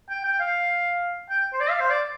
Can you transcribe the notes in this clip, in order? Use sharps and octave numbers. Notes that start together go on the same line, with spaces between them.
G5
G5
F5
G5
C5
D5
F5
C5
D5